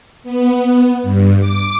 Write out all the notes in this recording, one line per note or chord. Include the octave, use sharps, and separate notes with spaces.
B3
G2
D6